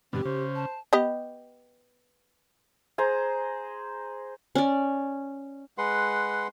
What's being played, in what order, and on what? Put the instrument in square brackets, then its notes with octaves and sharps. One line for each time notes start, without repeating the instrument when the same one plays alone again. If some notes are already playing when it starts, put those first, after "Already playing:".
[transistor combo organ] G2 B2 D3 [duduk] C4 [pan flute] G4
[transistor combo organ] C#3 [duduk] C5
[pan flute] A5
[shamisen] B3 G4 D#5
[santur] G#4 C5 A#5
[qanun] C#4 D5
[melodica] G#3 B4 F#5 C6